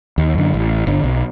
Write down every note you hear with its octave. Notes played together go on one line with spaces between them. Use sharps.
D#2
F#2 D3
A1
G1 D3
B1